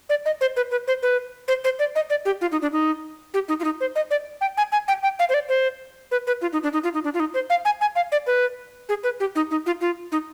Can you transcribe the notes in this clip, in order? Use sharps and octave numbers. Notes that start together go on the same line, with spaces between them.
D5
D#5
C5
B4
B4
C5
B4
C5
C5
D5
D#5
D5
G4
F4
D#4
D4
D#4
G4
D#4
F4
D#4
C5
D#5
D5
G5
G#5
G#5
G5
G5
F5
C5
D5
C5
B4
B4
F4
D#4
D4
D#4
F4
D#4
D4
F4
D#4
C5
F5
G#5
G#5
F5
D5
B4
G#4
B4
G4
D#4
D#4
F4
F4
D#4